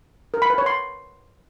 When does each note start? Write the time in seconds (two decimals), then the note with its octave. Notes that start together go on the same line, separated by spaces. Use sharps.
0.34 A#4
0.42 B5
0.50 B4
0.58 C#5
0.66 C6